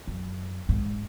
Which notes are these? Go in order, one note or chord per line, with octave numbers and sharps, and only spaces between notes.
F#2
G#2